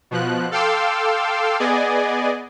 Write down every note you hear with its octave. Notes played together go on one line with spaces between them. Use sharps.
B2 F3 F#6
A4 F5 G5 C6 D6 E6
B3 G#4 D5 D#5 G#5